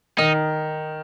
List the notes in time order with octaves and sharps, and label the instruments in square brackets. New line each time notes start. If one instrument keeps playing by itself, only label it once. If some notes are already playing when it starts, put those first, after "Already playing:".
[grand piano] D#3 [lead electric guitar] D#4